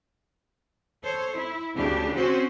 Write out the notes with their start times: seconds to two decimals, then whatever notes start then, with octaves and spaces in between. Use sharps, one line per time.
1.02 A4 C5 C#5
1.33 E4
1.75 D2 C#3 D4 G4
2.15 C4 C#4 F#4 C5